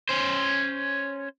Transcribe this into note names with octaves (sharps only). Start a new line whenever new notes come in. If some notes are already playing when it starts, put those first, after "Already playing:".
C#4 C5